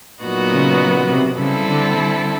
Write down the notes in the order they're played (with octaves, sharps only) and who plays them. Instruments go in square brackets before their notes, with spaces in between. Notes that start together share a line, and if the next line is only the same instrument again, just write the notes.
[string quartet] A#2 F#3 B3 D#4 F#4
[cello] C#3
C3
[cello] C#3 [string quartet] G3 C4 E4 A4
[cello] D3
D3